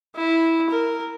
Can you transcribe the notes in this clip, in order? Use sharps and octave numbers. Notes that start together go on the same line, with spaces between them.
E4
A#4